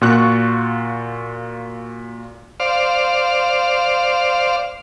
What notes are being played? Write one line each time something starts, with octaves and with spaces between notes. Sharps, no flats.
A#2 F4 F#4 C#6 F#6
C5 D5 F5